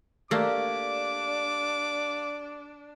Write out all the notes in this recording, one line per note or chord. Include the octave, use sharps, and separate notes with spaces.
A3 A#3 D4 G4 D5 F5 D6